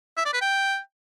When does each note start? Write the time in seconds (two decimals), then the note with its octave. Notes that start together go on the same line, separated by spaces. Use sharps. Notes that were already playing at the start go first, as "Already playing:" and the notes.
0.17 E5
0.25 D5
0.33 B4
0.41 G5